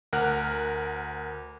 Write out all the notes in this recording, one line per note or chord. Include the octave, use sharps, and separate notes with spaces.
D2 A#4 F#5 F6 F#6